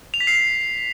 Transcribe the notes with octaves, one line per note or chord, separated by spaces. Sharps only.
F7
B6
C7